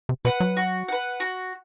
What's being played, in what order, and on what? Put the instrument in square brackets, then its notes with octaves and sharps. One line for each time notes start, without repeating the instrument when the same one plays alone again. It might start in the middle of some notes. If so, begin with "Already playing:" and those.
[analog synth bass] C3
[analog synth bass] B2 [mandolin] B4 F#5
[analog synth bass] F#3
[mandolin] F#4
B4 F#5
F#4